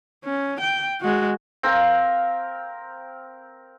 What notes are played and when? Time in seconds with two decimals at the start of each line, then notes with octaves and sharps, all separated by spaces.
0.24 C#4
0.61 G5
1.01 G#3 F#4
1.63 C4 A#4 F5